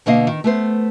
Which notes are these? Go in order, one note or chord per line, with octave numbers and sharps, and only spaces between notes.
B2 D3 A#3 D#5 F5
D#3
A3 B3 C5